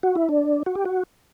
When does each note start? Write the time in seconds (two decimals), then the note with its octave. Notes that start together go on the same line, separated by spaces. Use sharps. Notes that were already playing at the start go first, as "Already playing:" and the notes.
0.03 F#4
0.15 E4
0.29 D4
0.66 F#4
0.75 G4
0.85 F#4